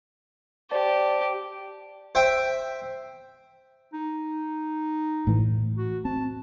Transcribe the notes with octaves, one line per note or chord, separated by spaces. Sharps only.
G4 C5 D5 A5
C5 E5 G5
D#4
A2 E3
F#4
C4 A5